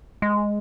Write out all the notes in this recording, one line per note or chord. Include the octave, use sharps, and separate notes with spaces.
G#3